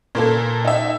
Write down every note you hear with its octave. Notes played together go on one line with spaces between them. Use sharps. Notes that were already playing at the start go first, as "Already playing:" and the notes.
A#2 A#3 A4
D#4 E5